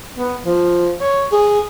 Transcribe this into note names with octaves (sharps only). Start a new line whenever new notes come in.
B3
F3
C#5
G#4